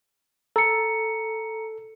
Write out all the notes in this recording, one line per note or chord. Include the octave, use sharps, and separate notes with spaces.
A4 A#5 C#7